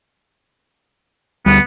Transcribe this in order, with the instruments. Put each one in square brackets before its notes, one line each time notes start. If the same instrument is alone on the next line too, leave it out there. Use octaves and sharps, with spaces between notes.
[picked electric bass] D2 G3 [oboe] B3